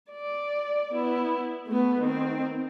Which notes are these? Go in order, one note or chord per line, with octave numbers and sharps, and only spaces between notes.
D5
B3 E4
A3 B3
D#3 C4